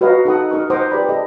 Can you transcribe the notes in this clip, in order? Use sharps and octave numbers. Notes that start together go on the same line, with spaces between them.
F#4 B4 C#5 D#5 F5 A#5
D#4 A4 F#5 D#6
D#4 A#4 C#6 D#6
C5 F#5 A#5 D6 D#6
G4 B4 D5 B5
A4 D5 D#5